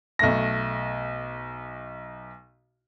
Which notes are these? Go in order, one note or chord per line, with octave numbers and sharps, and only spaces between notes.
B1 A3 A#6